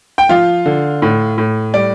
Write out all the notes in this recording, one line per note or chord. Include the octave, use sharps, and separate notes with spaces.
G5
F3 F4 F5
D3
A2
A2
G3 D5